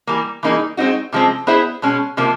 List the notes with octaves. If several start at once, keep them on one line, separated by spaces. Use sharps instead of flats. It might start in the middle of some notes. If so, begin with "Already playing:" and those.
E3 G3 A#3
E3 G3 A#3 D#4 G#4
G#3 C4 D#4 F#4
C3 F3 G#3 C4
B3 E4 G#4 C5 E5
B2 G#3 C#4
C3 F3 A#3